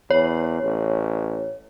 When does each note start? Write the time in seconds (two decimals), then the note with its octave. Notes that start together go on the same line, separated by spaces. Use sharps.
0.11 E2 C#5
0.63 A1